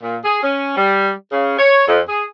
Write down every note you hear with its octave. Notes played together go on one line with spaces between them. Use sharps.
A#2
G#4
C#4
G3
C#3
C#5
F2
G#4